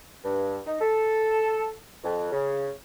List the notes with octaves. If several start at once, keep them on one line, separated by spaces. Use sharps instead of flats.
G2
D#4
A4
F2
C#3